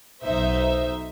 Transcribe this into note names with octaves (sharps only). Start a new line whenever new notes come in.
B1 D#4 C5 E5